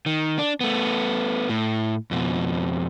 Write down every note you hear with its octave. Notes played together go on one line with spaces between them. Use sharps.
D#3
D4
A3 B3
A2
F2 B2